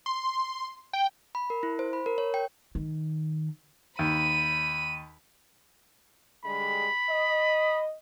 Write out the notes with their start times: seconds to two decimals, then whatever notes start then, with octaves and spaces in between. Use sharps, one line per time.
0.06 C6
0.93 G5
1.35 B5
1.50 A#4
1.63 E4
1.79 C5
1.93 B5
2.06 A#4
2.18 C#5
2.34 G5
2.75 D#3
3.99 D#2 B5 D#7
6.45 D3 G3 G#3 B5
7.09 D#5